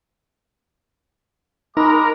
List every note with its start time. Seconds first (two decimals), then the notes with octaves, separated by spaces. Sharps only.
1.77 G#3 D#4 A#4 B5 D6